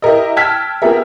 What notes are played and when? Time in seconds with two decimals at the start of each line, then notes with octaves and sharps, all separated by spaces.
0.02 E4 G4 A#4 D#5
0.36 G5 A5 E6 F6 G#6 B6
0.82 B3 F4 G4 G#4 A#4 E5